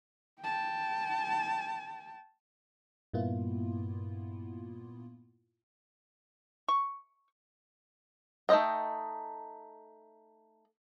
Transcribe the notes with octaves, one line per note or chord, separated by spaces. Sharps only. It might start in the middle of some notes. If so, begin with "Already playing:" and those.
G5 A5
G2 A#2 A#3 B3 E4 F4
C#6
A3 D#4 F4 D#5 G5